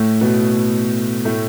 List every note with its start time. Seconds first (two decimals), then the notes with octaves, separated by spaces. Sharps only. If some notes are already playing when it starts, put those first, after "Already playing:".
Already playing: A2 A3
0.21 B2 B3
1.25 A2 A3